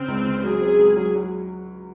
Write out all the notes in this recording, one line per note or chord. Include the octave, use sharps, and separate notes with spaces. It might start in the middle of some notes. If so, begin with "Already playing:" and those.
Already playing: C#3 C4
C#2
C#3
F#3 G#4
C4
C#2
F#3
F#3